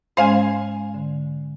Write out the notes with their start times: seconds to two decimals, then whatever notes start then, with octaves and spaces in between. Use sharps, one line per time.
0.17 G#2 G#3 C#4 C5 F5 G#5
0.94 D3